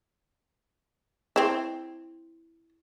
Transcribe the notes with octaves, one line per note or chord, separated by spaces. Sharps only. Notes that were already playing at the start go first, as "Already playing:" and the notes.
C4 E4